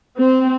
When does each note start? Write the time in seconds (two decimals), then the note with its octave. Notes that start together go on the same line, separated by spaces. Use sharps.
0.19 C4